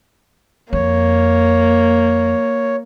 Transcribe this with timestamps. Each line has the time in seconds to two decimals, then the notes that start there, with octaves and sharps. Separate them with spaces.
0.73 F2 A#3 C#5